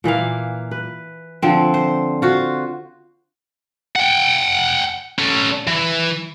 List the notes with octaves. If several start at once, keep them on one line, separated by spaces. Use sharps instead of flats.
A#2 E3 A#3 F5
B4
D3 F3 C4
C5
F4 F#4 C5
F#5 G5
C#4 A4
E3